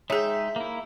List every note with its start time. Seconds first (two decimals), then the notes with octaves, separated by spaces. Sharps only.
0.10 G#3 D#4 G#4 C#5 E5 G5
0.56 A#3 E4